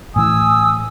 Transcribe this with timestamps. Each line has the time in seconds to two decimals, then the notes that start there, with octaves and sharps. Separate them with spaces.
0.16 A2 E3 G#5 D#6 E6